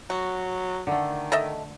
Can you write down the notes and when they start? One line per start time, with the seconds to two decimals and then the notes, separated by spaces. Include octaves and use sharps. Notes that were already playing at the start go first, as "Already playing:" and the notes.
0.10 F#3 F#4
0.87 D3 D#3 A3
1.32 A4 D#5 E5